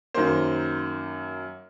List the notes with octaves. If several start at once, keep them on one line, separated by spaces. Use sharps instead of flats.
F#2 D#3 A#3 C5